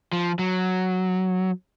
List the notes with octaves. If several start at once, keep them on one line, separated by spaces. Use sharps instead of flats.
F3
F#3